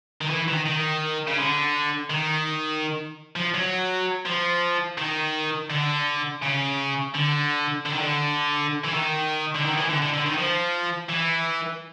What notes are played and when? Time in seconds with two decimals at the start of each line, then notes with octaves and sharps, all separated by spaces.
0.21 D#3
0.30 E3
0.48 D#3
0.66 D#3
1.27 C#3
1.38 D3
2.10 D#3
3.36 F3
3.54 F#3
4.26 F3
4.98 D#3
5.70 D3
6.42 C#3
7.14 D3
7.86 D3
7.93 D#3
8.01 D3
8.84 E3
8.94 D#3
9.56 D3
9.65 D#3
9.77 E3
9.90 D3
10.02 D3
10.13 D3
10.26 D#3
10.37 F3
11.09 E3